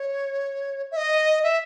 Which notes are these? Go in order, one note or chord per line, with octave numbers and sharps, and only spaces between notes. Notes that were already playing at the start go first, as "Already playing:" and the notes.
Already playing: C#5
E5
D#5
E5